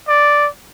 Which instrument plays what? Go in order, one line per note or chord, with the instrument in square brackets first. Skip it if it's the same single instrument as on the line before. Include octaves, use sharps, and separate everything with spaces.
[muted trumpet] D5